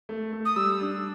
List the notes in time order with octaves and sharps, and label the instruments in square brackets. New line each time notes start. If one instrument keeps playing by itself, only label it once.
[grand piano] A3
A3
[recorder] D#6
[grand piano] G3 [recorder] E6
[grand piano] D4